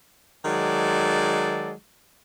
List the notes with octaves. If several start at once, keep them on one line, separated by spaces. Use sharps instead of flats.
D#3 F#3 G#3 A4 D5